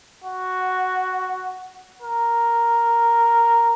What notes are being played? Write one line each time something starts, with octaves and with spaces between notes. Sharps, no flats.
F#4
A#4